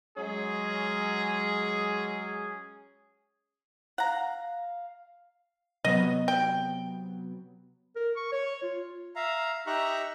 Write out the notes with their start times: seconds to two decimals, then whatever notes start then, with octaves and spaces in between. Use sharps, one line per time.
0.17 F#3 G#3 C#4 G#4
3.98 F5 F#5 A#5
5.84 C3 F#3 B3 D#5
6.28 G5
7.96 A#4
8.17 C#6
8.32 C#5
8.63 F4
9.16 E5 F5 A#5
9.67 D#4 G4 E5 A#5 C#6 F#6